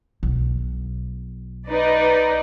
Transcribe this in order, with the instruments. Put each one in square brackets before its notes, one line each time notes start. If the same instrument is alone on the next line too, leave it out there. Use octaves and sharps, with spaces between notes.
[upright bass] B1
[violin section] D#4 B4 D5